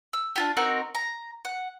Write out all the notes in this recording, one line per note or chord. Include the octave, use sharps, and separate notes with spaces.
E6
D4 F4 G4
C4 D#4 F#4 A#4
A#5
F#5